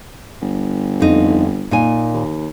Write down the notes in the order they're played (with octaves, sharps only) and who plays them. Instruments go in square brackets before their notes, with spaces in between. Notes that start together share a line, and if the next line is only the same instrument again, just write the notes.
[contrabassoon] G1
[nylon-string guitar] F2 D#4
A#2 D#4 G#5
[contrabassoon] D#2